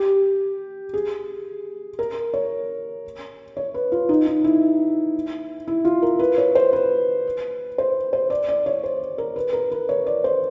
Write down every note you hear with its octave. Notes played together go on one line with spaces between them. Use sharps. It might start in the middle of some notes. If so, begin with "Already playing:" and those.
Already playing: G4
G#4
A#4
C#5
C#5
B4
F4
D#4
D#4
E4
E4
F4
A#4
B4
C#5
C5
B4
C5
C5
D5
D5
C#5
C5
A#4
B4
A#4
B4
C#5
D5
C5